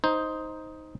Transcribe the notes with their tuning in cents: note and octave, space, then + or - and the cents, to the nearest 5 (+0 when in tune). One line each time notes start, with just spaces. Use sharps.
D#4 +10 C5 +0